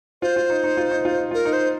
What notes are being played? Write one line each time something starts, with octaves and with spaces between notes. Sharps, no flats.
F4 C5
F4
D#4
D#4
F4
D#4
F4
D#4
F4 A#4
D#4
C5